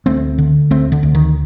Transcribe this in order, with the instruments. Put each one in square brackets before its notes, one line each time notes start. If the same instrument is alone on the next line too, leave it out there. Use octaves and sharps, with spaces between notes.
[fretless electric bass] D2 A3 C4
D3
D2 A3 C4
D3
D2
D#3